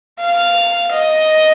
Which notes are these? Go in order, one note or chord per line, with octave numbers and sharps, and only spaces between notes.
F5
D#5